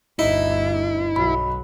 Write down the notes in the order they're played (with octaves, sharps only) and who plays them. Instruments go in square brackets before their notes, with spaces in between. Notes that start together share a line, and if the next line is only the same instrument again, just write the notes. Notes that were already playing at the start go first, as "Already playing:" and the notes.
[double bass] G1 D2 [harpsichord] D#4 [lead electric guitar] E4
[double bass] B1 F#3 [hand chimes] B5